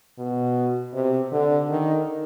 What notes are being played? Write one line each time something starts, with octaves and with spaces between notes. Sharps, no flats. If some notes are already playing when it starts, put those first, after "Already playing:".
B2
C3
D3
D#3